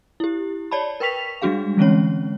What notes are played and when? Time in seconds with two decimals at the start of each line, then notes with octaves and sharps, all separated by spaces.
0.20 E4 G4
0.71 C#5 D5 A5 B5
1.00 A#4 B4 G5 C#6 B6 F7
1.42 G3 G#3 D4 F#4 G#4 F5
1.77 D3 E3 G#3 C4 C#4 C#5